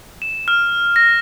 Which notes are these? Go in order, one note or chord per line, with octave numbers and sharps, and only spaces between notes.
E7
F6
A#6